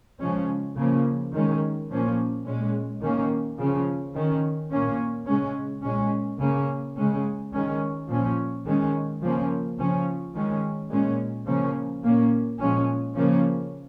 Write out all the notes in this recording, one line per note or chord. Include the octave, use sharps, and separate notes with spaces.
C#3 F3 G#3 C#4
C#3 F3 A#3 C#4
D#3 G#3 C#4
A#2 F3 A#3 C#4
A#2 G#3 C#4
D#3 A#3 C#4
C#3 F3 C#4
D#3 C#4
A#2 A#3 C#4
C#3 G#3 C#4
A#2 G#3 C#4
C#3 A#3 C#4
C#3 G#3 C#4
D#3 G#3 C#4
A#2 F3 C#4
D#3 G#3 C#4
C#3 F3 A#3 C#4
C#3 F3 C#4
D#3 G#3 C#4
A#2 G#3 C#4
C#3 F3 A#3 C#4
A#2 A#3 C#4
A#2 F3 G#3 C#4
C#3 F3 A#3 C#4